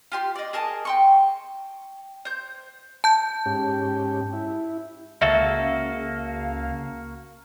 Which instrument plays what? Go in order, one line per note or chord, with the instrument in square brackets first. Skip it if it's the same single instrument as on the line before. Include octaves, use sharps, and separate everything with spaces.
[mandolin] F4 G4 C6
D5 D#5
G#4 A#4 D#5 A5
G5 C6 C#6
C5 G6
[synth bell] A5 G6
[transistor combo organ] G#2 C#4 G4
E4
[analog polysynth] C#2 C#3 F5 [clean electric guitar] A#3 F#4 A4 [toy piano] E5